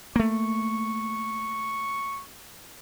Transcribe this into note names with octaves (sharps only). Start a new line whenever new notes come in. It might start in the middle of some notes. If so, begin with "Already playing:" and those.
A3 A#3 C#6